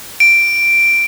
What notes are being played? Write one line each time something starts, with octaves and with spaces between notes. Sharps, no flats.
D7